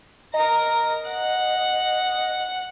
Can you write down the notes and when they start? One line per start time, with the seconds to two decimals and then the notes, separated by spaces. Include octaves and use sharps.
0.34 A#4 D#5 A#5
1.09 F#5